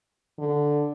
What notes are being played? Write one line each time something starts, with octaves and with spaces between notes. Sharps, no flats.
D3